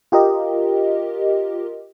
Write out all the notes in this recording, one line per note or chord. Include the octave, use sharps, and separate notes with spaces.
F4 G4 A#4 D#5